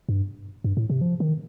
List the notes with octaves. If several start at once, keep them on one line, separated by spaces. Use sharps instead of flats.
G2
G2
A2
C3
F3
D#3